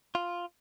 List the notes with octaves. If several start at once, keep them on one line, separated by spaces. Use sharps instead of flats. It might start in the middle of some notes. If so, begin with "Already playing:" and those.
F4